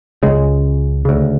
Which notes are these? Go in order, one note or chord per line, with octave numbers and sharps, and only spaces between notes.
C#2 C#3 G#3
D2 C#3